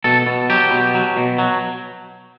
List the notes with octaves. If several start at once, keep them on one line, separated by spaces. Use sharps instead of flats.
B2 A4
B2
F#3 G4
B2
F#3
B2
F#3